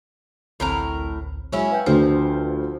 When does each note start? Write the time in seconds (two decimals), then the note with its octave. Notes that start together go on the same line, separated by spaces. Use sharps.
0.60 A1 D2 A2 C4 A#4 A#5
1.52 F#3 G#3 C#4 E4
1.72 B4 F5 G5
1.86 D2 F3